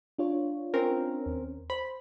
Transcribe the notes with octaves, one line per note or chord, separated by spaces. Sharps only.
D4 F4 C#5
C4 C#4 A#4
D#2
C5 B5